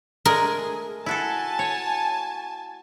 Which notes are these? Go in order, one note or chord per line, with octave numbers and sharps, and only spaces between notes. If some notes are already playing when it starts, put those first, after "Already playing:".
G#3 A3 G#4 A#4
E4 F#4 A4 G#5 A5
C#5